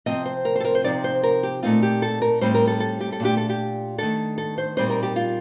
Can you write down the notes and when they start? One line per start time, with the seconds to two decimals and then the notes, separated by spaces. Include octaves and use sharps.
0.06 C3 F3 C4 D#5
0.26 C5
0.45 A#4
0.56 A4 C5
0.65 A#4
0.75 C5
0.84 C3 F3 C4 D#4 D5
1.04 C5
1.23 A#4
1.43 G4
1.63 A#2 A3 C4 D#4 F4
1.83 G4
2.02 A4
2.22 A#4
2.41 A2 G3 C4 D#4 C5
2.54 A#4
2.67 A4
2.80 A4
3.00 G4
3.12 A4
3.20 A#2 A3 D4 G4
3.37 A4
3.49 G4
3.98 D#3 A3 D4 A4
4.38 A4
4.58 C5
4.77 A#2 G3 C4 D#4 C5
4.90 A#4
5.03 G4
5.16 F4